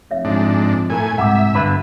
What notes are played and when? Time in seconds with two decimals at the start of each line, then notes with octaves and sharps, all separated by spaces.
0.11 F1 C#5 E5
0.25 F2 G#2 D4
0.90 A2 A#4 G#5 A#5
1.18 C2 G#2 E5 F#5 G5 D6
1.55 G2 D3 B4
1.67 B2